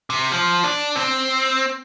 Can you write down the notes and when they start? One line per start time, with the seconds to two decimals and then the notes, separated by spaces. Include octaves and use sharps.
0.10 C3
0.32 F3
0.64 D4
0.96 C4